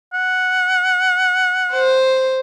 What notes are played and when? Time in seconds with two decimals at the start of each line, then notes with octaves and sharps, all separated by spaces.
0.13 F#5
1.73 C5